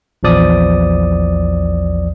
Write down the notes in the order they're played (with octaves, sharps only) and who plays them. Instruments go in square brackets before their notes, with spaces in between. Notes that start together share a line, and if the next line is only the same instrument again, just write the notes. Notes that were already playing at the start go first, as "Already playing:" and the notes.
[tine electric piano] A#1 E2 F3 D5 D#6